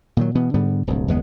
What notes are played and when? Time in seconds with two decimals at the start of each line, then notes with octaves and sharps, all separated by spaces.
0.17 A#2 D#3 F#3
0.35 B2 E3 B3
0.54 G#2 D3 G3 B3
0.87 D1 C2 G2
1.08 F#1 D#2 G#3 B3